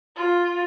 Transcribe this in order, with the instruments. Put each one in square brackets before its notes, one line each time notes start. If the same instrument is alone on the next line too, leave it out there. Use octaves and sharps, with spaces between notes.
[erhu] F4